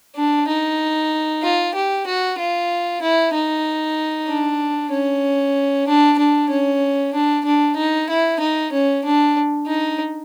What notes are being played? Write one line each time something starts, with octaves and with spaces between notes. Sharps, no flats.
D4
D#4
F4
G4
F#4
F4
E4
D#4
D4
C#4
D4
D4
C#4
D4
D4
D#4
E4
D#4
C#4
D4
D#4